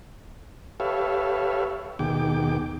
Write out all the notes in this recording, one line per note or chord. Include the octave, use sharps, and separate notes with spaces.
G4 A4 B4 C#5 E5 F5
D#2 B2 D#3 G#4 G5 D6